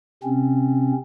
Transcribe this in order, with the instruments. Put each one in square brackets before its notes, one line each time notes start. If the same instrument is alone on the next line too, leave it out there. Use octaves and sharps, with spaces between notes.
[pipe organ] C3 C4 C#4